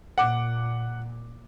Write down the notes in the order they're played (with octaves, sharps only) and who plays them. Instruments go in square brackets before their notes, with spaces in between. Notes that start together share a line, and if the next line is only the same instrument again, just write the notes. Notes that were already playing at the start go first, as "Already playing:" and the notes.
[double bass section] A#2 [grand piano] F#5 D6